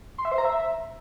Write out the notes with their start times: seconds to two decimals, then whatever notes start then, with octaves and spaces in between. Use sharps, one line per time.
0.18 C6
0.25 E5
0.32 C5
0.38 A#5
0.45 E5